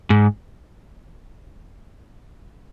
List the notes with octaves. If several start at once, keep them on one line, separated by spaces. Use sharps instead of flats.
G#2